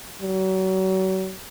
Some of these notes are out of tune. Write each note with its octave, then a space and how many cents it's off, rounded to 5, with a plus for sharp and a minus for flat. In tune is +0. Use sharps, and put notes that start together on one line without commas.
F#3 +35